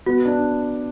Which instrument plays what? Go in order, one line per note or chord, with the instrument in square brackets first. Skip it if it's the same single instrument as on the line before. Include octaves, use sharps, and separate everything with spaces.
[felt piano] B3 [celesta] F#4
[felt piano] D4